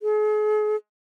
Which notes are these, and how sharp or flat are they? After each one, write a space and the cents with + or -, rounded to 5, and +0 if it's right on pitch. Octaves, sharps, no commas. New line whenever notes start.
G#4 +40